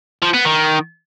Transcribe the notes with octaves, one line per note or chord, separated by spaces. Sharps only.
F3
B3
D#3